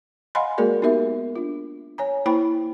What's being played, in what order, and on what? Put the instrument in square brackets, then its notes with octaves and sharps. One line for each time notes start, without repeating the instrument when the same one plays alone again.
[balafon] D#5 F5 F#5 G#5 B5 C6
G#3 A#3 F#4 G#4 A#4 D5
B3 D#4 F#4 G4 A#4 E5
D4 F4
C#5 G#5 A#5
A#3 E4 C5 G5 B5